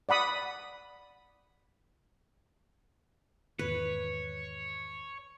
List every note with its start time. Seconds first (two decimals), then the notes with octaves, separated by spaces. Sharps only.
0.09 D5 F#5 B5 D#6
3.59 E2 G#2 D#3 B4 C#5